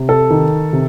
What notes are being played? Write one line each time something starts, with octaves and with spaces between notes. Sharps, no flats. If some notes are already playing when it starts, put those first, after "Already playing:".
Already playing: C3
A4
D#3
C3